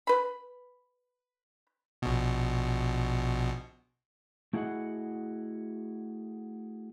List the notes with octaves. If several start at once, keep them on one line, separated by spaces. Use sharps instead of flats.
B4 B5
A#1 B2
A3 E4 F#4 G#4 D#5 F#5